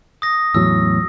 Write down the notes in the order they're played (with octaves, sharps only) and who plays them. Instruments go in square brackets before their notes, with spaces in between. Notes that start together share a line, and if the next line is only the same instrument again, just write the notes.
[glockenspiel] D#6 A#6
[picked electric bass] E2 A2 F#3 [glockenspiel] E6